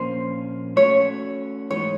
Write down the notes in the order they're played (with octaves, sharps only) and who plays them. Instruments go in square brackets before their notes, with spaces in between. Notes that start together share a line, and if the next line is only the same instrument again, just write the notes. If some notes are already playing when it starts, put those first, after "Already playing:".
Already playing: [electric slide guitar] A#2 F3 A#3 C#4 [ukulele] C5
[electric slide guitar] A3 C#4 F#4 [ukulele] C#5
[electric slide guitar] G#2 E3 G#3 B3 D#4 [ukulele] C#5